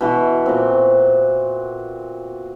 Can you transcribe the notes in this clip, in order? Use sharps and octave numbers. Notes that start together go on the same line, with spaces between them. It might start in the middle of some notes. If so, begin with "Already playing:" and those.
B2 E3 F#4
A#2 C4